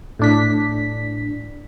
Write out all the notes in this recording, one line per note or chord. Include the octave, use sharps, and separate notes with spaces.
A2 D4 B6